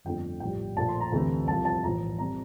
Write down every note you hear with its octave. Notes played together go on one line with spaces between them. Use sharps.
G1 F2 D3 A3 G5
A#1 A2 G3 G5
A#1 A#2 A3 A5
C6
A#5
D2 C3 E3 A3
C2 C3 F3 A5
A5
A#1 A2 E3 A#5
C3 G3 A#5